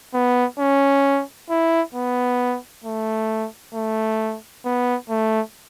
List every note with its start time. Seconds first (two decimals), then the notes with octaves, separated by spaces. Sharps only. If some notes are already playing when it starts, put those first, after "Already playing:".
0.14 B3
0.59 C#4
1.50 E4
1.94 B3
2.84 A3
3.74 A3
4.65 B3
5.10 A3